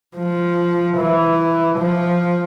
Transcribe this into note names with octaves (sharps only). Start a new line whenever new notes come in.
F3
E3
F3